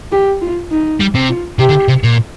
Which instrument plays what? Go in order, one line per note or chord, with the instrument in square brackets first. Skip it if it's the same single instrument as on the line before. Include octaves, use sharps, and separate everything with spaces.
[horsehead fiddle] G4
F4
D#4
[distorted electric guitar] G3
C3
[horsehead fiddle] F4
[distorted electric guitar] C3 [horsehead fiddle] G4
[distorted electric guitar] D3
C3
A#2